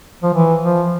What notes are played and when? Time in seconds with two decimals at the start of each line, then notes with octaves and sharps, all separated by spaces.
0.22 F3
0.34 E3
0.63 F3